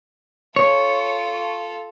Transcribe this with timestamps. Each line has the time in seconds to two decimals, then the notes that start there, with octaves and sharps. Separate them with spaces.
0.56 F4 A4 C#5